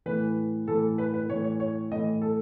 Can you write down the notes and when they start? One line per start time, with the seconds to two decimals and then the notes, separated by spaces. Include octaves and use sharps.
0.06 A2 E3 B4
0.68 A2 E3 A4
0.98 B4
1.14 B4
1.29 A2 E3 C#5
1.44 C#5
1.60 C#5
1.91 A2 D#5
1.95 E3
2.22 A4